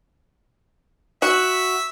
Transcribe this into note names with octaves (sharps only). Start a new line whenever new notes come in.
F#4 E5